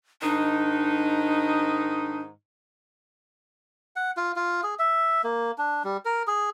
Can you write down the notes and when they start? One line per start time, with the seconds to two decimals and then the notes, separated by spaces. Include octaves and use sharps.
0.22 G#2 D#3 D4 D#4
3.96 F#5
4.17 F4
4.36 F4
4.63 G#4
4.79 E5
5.24 A#3
5.58 D4
5.84 G3
6.05 A#4
6.27 G#4